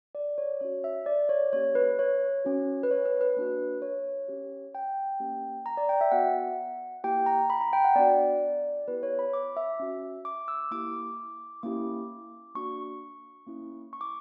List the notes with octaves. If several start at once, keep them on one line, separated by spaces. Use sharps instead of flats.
D5
C#5
C#4 F#4 C#5
E5
D5
C#5
A#3 C#4 G4 C#5
B4
C#5
C#4 F#4
B4
C#5
B4
B4
A#3 D4 F#4
C#5
C#4 G4
G5
A#3 C#4 G4
A#5
D5
G5
E5
B3 F#4 F#5
A#3 E4 G4 G5
A#5
B5
A#5
G5
F#5
B3 D4 F#4 D5
B3 E4 G4 B4
C#5
B5
D6
E5
C#4 F#4
D6
E6
A#3 E4 G4 D6
A#3 C#4 E4 G4 D6
A#3 D4 F#4 C#6
A#3 C#4 E4
C#6
D6